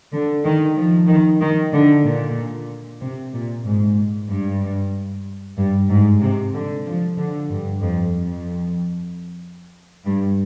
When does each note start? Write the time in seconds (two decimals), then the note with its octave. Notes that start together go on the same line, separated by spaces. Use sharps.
0.13 D3
0.45 D#3
0.77 F3
1.08 D#3
1.41 D#3
1.73 D3
2.05 A#2
3.01 C3
3.33 A#2
3.65 G#2
4.29 G2
5.57 G2
5.90 G#2
6.21 C3
6.53 D3
6.85 F3
7.17 D3
7.50 G2
7.82 F2
8.14 F2
10.06 G2